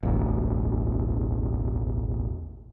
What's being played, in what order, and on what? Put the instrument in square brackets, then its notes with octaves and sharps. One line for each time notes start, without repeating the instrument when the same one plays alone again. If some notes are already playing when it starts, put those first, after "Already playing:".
[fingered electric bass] E1 A1 D2